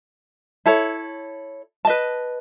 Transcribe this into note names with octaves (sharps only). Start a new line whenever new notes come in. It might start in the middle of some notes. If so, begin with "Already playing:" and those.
E4 A4 C#5
B4 D#5 A5